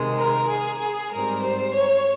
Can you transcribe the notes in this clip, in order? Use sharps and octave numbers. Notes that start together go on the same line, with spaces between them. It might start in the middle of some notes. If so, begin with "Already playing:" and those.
Already playing: C3 D#3 G#3
A#4
G#4
G#4
G#2 G3 C4 A#4
C5
C#5